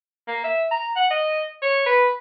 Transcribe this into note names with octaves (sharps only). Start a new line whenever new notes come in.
A#3
E5
A#5
F#5
D#5
C#5
B4